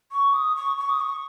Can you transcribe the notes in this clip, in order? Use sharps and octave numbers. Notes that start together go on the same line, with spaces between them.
C#6
D#6
C#6
C#6
D#6
C#6